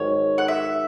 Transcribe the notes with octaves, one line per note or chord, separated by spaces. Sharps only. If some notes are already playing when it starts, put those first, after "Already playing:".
Already playing: G#2 D#3 F#3 C#5
F#5
E5